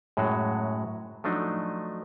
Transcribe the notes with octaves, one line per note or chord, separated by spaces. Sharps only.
F#2 A2 F#3 G#3 F#4
F3 F#3 A3 D4 D#4